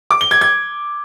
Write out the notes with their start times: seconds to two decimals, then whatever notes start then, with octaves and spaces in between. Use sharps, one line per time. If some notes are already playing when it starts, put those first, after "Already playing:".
0.11 D6
0.21 G7
0.31 G#6
0.41 G#6